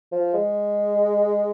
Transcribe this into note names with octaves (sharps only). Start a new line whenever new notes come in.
F3
G#3